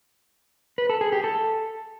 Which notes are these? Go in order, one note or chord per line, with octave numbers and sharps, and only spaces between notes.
B4
A4
G#4
G4
A4